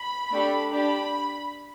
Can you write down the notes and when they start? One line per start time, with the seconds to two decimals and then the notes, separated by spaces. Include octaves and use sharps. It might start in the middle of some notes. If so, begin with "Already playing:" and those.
Already playing: B5
0.31 A3 D4 G4
0.72 D4 G4 B5